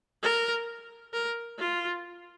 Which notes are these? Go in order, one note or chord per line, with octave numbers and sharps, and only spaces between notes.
A#4
A#4
F4